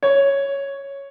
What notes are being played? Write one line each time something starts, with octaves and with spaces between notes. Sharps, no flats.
C#5